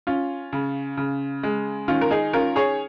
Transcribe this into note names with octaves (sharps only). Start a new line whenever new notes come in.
C#4 F4
C#3
C#3
G#3
D#3 C#4 F4
A#4
D#4 G#4
C#4 F4 A#4
G#4 C#5